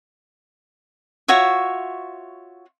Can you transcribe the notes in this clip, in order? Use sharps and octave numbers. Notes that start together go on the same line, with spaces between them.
F4 F#4 C#5 E5